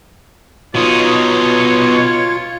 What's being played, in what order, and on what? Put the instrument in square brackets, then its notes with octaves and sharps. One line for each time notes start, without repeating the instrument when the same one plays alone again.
[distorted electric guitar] B2 D#4 [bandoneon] F4 [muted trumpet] C#5